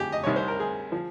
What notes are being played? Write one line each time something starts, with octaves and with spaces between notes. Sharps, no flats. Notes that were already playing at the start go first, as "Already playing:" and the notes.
Already playing: F2 G4 G#4
D#5
C2 C3 D#3 C#5
C5
A#4
G#4
F3